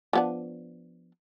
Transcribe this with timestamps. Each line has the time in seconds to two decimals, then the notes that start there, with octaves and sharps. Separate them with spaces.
0.13 F3 B3 D4